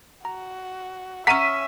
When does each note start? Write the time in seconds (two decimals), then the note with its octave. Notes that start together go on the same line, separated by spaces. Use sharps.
0.25 F#4 A#5
1.27 A#3 C#4 E5 F#5 A#5 B6 D#7